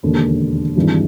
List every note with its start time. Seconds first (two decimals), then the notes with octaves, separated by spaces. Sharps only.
0.03 E1 D#2 D3
0.76 G#1 G2 E3 G#3